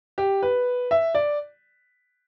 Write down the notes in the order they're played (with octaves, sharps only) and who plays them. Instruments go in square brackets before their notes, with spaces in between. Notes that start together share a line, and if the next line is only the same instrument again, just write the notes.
[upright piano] G4
B4
E5
D5